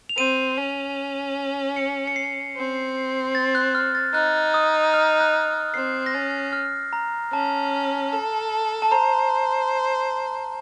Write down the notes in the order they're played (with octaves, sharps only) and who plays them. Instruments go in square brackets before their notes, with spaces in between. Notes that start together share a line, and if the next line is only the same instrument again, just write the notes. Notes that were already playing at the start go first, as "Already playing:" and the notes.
[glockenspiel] F7
[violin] C4 [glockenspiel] D#7
[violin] C#4
[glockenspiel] C#7
C#7
C7
[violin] C4
[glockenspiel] A6
F#6
F6
A6
[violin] D#4 [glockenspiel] F#6
[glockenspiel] D#6
F6
F#6
[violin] C4 [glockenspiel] C7
[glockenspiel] A#6
[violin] C#4 [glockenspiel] A6
[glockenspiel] F6
A#5
[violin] C#4 [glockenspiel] A5
[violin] A4
[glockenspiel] A5
[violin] C5 [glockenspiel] A#5